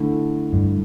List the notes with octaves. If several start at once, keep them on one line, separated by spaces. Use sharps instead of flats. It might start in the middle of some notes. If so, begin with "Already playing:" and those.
Already playing: D3 A3 E4
G2